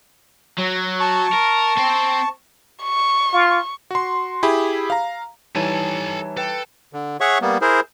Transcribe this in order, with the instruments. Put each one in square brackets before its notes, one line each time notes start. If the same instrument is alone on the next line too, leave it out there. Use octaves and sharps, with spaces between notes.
[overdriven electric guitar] F#3
[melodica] A5 C#6
[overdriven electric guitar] A#4
C4 C5
[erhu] C#6
[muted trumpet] F4
[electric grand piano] F#4 C6
E4 G4 G#4 B5
F5 A#5
[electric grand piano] E3 G3 [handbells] D#4 C#5 A5 [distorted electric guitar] A4 G#5
[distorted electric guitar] A4 [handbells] B4 G5
[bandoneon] D3
G#4 C#5 E5 F#5 C#6
G3 A#3 B3
E4 G#4 A#4 C5